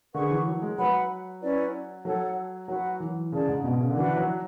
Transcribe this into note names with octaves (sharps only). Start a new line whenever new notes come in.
D3 G#4 B4 F#5 C#6
E3
F#3
G#3
F#3 B4 F#5 B5
C#4 E4 B4 D5
F#3 A4 C#5 F#5
F#3 F#4 B4 F#5
E3
C#3 G#4 D5 A5
G#2
B2
C#3
D3
E3 D4 F#4 B4 E5
F#3